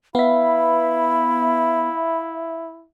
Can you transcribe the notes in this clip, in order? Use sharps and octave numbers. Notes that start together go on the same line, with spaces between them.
B3 E4 E5 F5 B5